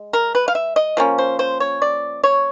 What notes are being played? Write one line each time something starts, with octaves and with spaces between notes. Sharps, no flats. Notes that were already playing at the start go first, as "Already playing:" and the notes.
Already playing: G#3
A#4
B4
F5
E5
D#5
F3 A#3 C#4
C5
C5
C#5
D5
C#5